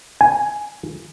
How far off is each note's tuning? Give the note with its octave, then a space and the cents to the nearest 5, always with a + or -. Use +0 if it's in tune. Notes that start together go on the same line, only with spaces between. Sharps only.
G#5 +5